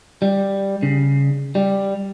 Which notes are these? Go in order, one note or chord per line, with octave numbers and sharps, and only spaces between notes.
G3
C#3
G3